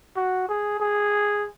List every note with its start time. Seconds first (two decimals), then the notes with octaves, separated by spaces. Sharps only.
0.16 F#4
0.49 G#4
0.80 G#4